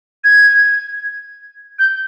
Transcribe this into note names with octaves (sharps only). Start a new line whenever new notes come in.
G#6
G6